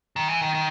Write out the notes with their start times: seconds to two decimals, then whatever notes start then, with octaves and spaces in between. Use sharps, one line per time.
0.16 D#3
0.29 E3
0.42 D#3
0.54 D#3